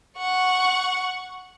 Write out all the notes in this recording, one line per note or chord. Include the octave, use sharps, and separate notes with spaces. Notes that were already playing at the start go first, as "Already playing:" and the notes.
F#5 C#6